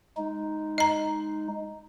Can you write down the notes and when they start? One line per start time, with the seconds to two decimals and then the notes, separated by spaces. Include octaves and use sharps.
0.17 G#3 D#4
0.78 D#5 A#5